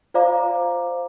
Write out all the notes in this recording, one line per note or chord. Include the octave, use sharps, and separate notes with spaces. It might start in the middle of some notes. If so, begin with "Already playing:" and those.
F4 C5 D5 F5 A#5 D6